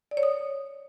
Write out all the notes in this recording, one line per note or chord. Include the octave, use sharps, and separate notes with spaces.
D5
C#5
D#6